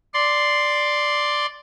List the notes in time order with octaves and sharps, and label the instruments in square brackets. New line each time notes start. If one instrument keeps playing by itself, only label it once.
[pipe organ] D5 C6